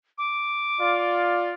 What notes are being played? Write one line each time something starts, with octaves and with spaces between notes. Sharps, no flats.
D6
F4 D5